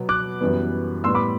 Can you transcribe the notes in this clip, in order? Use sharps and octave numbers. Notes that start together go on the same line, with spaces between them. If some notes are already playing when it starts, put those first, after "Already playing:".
Already playing: B2 F#3 B3
D6 F#6
F#2 E3 G3 B3
A2 G3 B3 C6 E6
B5 D6